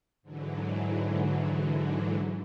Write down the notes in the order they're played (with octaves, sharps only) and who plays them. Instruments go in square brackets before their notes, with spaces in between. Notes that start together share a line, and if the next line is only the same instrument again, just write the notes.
[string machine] G#2 D3 E3 F#3